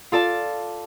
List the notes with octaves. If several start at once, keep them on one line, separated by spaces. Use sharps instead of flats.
F4 A4 D5 A5